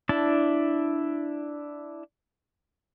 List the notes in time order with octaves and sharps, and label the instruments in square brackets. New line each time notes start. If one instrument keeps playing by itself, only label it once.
[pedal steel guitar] D4 E4 A5